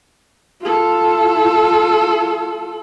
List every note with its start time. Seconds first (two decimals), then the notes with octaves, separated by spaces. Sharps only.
0.61 F4 A4